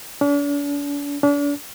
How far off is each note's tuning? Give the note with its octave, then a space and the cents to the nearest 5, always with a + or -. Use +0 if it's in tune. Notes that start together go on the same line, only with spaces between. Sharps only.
D4 -45
D4 -40